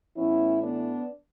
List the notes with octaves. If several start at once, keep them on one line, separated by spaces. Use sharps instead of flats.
A2 E3 B3 C#4 E4
B3 D4